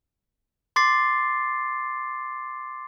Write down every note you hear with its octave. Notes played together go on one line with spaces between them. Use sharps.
C6 D6 A6 C7